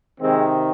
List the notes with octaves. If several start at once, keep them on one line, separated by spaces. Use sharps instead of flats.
C3 D#3 G#3 C4